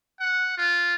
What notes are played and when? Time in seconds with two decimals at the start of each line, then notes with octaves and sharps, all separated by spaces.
0.20 F#5
0.57 F4